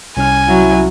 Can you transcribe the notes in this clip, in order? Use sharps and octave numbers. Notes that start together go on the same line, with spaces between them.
C2 C#4 G#5 F6
F#3 E4